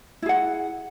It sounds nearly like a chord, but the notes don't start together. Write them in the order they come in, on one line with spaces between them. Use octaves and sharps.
E4 G#4 F#5